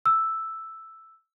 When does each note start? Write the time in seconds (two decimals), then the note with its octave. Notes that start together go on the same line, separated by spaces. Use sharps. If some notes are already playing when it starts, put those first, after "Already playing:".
0.06 E6